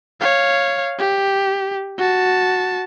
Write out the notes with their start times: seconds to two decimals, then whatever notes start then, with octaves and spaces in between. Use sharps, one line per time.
0.21 C#5 F5
0.99 G4
1.98 F#4 A5